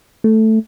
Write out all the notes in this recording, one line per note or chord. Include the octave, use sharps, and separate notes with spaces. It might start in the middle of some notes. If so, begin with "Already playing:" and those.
A3